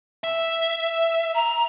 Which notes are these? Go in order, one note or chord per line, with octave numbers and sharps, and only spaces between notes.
E5
A#5